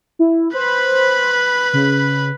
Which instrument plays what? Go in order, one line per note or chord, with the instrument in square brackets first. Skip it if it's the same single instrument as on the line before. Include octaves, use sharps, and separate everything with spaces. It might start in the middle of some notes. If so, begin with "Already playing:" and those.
[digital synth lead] E4
[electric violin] B4 B5 [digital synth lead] C5
[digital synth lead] C#3